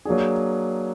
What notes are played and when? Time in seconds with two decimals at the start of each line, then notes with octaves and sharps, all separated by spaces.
0.05 F#3 A#3 D4 G#4